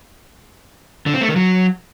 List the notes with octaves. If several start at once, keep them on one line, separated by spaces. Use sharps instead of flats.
D3
C4
A3
D#3
F#3